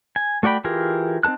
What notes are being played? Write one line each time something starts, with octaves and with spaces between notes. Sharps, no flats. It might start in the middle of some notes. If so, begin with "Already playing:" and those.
G#5
A3 F#4 D5 G5 B5
E3 F4 G4 G#4 A#4
C4 D#4 A4 A5 F#6